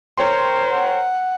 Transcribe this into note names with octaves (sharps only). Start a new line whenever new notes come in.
A#4 C5 C#5 G5 C6
F#5